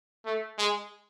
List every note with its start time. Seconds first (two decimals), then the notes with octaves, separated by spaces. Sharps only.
0.25 A3
0.58 G#3